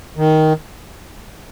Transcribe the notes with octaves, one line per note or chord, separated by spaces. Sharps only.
D#3